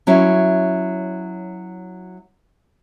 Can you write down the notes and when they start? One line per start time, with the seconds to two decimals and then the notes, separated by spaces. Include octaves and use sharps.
0.07 F#3 C#4 E4